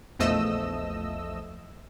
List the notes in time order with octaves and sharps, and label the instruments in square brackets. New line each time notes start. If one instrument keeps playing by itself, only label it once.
[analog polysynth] A#1 E2 F3 A3 D#5 E6